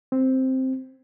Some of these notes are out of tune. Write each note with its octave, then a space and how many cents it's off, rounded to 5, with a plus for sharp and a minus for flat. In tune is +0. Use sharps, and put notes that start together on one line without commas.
C4 +0